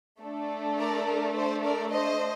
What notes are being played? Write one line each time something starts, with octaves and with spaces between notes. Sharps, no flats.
A3 D4 A4
A#4 D5
A#4
C5
A#4 D5
C5 D#5